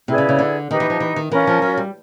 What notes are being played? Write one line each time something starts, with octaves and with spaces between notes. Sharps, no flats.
C3 E4 G#4 B4 D5
C#3
C#3
D3
D#3 D#4 G4 B4
E3
F3
E3
D#3
E3 C#4 F4 A#4
F3
F#3
G3